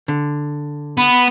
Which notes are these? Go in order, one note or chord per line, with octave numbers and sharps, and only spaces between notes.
D3
B3 B5